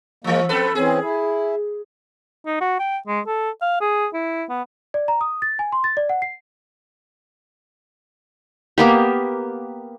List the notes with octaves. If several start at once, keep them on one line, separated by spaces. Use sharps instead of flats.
E3 F3 G#3 A#3
F2 C4 A4 B4
E3 C4 C#4 G#4
E4
D#4
F#4
G5
G#3
A4
F5
G#4
E4
B3
D5
A#5
D#6
A6
G#5
C6
A6
D5
F#5
C7
A#3 B3 G4